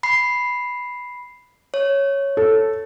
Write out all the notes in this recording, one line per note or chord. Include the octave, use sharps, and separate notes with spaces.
B5 C7
C#5
A4